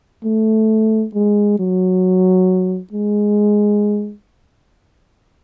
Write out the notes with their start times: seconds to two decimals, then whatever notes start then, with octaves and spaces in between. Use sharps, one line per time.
0.24 A3
1.14 G#3
1.59 F#3
2.92 G#3